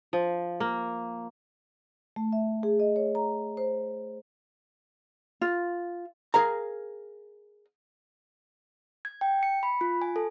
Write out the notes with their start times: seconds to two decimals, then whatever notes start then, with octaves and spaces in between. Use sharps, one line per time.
0.13 F3
0.60 A#3
2.16 A3
2.33 E5
2.63 G#4
2.80 D#5
2.96 C#5
3.15 A#5
3.57 C5
5.41 F4
6.34 G#4 A#4 F5 A#5
9.05 G#6
9.21 G5
9.43 C#7
9.63 B5
9.81 F4
10.02 G#5
10.16 A4